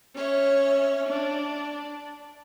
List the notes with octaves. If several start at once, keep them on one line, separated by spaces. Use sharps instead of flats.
C#4 C#5 E5
D4